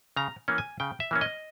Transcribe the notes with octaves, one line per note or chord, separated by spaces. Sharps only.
C#3 A#5
E3 A#3 C#4
G#5
C#3 G5
E5
E3 A#3 C#4
D#5